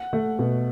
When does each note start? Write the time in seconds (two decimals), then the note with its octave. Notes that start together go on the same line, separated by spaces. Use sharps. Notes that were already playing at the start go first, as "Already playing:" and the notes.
Already playing: F#5
0.13 A3
0.39 B2